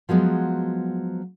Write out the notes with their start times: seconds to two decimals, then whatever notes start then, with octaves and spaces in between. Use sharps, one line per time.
0.09 F3 F#3 G#3 B3